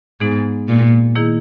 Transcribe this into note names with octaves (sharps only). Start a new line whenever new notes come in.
G#2 G#3 B3 D#4 G#4
A#2
D#3 A#3 E4 G#4